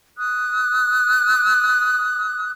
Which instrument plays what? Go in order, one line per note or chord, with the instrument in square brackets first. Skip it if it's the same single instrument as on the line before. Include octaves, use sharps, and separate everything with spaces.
[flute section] D#6 F#6